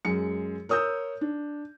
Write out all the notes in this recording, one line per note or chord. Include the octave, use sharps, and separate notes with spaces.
F#2 G#3 C#7
A#4 C#5 D#6 E6 G6
D4